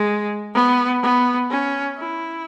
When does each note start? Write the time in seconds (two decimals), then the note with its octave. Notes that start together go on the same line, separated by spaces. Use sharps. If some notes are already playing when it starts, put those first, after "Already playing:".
Already playing: G#3
0.55 B3
1.02 B3
1.50 C#4
1.97 E4